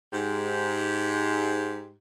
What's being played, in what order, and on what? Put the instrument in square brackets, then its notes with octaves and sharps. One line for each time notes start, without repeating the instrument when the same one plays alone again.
[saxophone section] G#2 G4